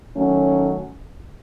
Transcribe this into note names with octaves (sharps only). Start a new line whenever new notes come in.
D#3 F#3 A3 C#4